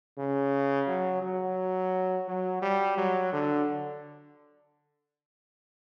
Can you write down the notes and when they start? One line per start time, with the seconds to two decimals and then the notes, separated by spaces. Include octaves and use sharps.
0.18 C#3
0.87 F#3
1.22 F#3
2.28 F#3
2.62 G3
2.97 F#3
3.33 D3